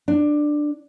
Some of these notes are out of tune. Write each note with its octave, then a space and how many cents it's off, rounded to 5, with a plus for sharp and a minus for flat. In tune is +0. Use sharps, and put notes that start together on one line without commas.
D4 +10